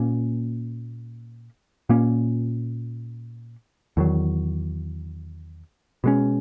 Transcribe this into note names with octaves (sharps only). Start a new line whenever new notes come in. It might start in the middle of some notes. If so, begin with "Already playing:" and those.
Already playing: A#2 A#3 C#4
A#2 A#3 C#4
E2 D#3 F#3
B2 G#3 C#4